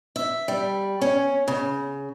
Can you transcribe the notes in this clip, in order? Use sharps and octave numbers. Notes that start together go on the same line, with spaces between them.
E5
G3
C#4
C#3